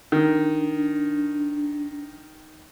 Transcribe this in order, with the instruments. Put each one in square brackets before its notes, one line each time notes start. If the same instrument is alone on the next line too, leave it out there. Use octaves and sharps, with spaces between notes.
[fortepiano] D#3 [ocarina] D4